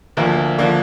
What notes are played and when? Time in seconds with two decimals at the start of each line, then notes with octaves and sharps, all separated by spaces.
0.17 D2 D3 F3 A#3 D4 A#4
0.58 D3 F3 A#3 D4